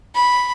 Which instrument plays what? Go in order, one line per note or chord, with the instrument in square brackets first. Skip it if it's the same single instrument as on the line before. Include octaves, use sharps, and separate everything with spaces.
[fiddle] B5